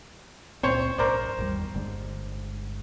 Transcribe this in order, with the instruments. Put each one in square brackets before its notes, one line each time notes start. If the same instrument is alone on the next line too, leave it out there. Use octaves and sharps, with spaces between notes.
[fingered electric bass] C#2 A#2 C4 [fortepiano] C5 C#5
[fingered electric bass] A#1 G#2 [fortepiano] A#4 C5 D5
[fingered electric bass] G#1 E2 G3
G1 D3 G#3